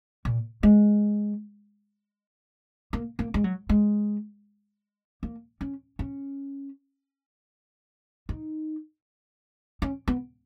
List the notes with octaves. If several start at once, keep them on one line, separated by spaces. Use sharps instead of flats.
A#2
G#3
A#3
A#3
G#3
F#3
G#3
A#3
C#4
C#4
D#4
C#4
B3